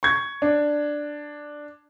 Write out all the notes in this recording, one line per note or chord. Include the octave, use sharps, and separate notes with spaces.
C#6 G#6
D4